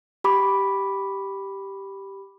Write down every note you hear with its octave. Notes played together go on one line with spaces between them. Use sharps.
G4 B5 D6